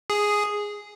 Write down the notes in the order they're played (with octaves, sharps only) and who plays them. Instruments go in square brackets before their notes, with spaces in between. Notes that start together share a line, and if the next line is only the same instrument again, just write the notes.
[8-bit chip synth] G#4